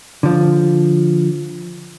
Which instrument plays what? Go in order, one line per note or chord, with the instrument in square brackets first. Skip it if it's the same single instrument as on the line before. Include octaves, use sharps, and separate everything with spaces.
[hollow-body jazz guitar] D3 F3